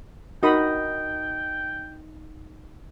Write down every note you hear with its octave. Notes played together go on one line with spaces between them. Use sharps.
D#4 F#4 A#4 G5 B5 D#6 A#6